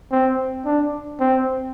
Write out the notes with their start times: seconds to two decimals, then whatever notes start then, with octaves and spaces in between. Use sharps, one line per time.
0.11 C4
0.66 D4
1.20 C4